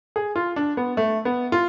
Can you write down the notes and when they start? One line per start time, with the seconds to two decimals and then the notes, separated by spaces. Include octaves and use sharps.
0.16 G#4
0.36 F4
0.56 D4
0.77 B3
0.97 A3
1.25 B3
1.52 F4